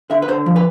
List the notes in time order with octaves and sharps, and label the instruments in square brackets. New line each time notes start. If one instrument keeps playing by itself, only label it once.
[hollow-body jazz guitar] D3 E5
B4
D3 C5
F3
B4